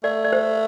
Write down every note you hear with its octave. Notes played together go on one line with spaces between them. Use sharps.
A3 D5
D5
C5